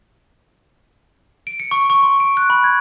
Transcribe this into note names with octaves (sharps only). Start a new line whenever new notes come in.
D7
C#7
C#6
C#6
C6
D7
F#6
B5
G#6